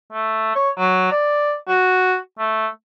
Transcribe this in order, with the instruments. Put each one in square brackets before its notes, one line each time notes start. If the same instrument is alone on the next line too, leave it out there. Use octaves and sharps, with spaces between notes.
[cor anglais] A3
C#5
F#3
D5
F#4
A3